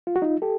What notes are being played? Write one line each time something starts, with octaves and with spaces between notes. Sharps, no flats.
F4
F#4
D#4 F4
G4 A4